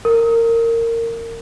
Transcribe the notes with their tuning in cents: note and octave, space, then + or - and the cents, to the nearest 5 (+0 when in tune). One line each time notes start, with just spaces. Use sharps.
A#4 -20